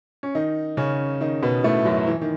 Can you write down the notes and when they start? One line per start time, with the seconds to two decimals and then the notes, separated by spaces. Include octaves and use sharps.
0.23 C#4
0.35 D#3 D#4
0.77 C#3 C#4
1.21 D#3 D#4
1.43 B2 B3
1.64 A2 A3
1.85 F#2 F#3
2.08 E3
2.21 D#3